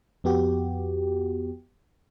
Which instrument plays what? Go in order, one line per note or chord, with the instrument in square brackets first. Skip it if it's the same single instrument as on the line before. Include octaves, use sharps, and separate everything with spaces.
[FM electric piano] F2 B3 F#4 G4